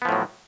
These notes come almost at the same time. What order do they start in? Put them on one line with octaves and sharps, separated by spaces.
B3 F3 A2 F#3